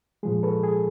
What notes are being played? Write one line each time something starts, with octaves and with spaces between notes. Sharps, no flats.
A#2 F3 G#3 G#4
A4 B4
G#4